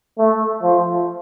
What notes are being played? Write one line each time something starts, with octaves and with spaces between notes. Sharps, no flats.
A3
F3